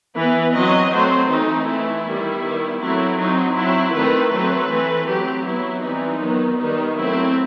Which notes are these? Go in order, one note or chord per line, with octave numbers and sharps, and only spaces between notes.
E3 B3 B4
F#3 C4 D#5
F#3 A3 C4 C5
E3 A3 C4 D#4
E3 A3 C4 E4
D#3 G3 B3
D#3 G3 B3
F#3 A3 C4 E4
F#3 C4 D#4
F#3 C4 E4
D#3 A3 C4 B4
F#3 A3 C4 B4
E3 A3 C4
F#3 C4 G4
F#3 B3 E4
E3 G3 C4 D#4
D#3 F#3 B3
D#3 G3 B3 D#4
F#3 A3 C4 E4